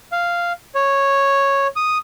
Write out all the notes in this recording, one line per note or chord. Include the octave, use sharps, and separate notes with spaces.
F5
C#5
D#6